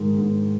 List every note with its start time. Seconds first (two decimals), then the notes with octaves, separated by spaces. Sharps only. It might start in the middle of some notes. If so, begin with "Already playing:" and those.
Already playing: G#2 D#3 G#3
0.18 G#2